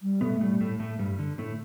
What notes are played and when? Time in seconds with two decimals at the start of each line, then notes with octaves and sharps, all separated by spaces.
0.02 G3
0.21 B2 A3 B3
0.40 A2 G3 A3
0.61 A2 A3
0.79 A2 A3
0.99 G2 G3
1.19 D3
1.38 A2 A3